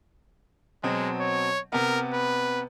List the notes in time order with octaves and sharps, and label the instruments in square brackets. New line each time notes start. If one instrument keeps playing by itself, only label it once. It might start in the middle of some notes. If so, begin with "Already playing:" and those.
[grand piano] B2 F#3 C4 [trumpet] G#3
[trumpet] C#5
[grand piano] C3 B3 [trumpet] A#4
[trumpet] B4